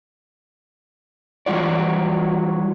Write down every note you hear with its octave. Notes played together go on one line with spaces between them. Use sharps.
E3 F#3 G3 F4 F#4 D5